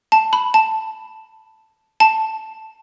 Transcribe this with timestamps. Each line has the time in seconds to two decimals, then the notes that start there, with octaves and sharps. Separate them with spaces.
0.12 A5
0.33 B5
0.54 A5
2.00 A5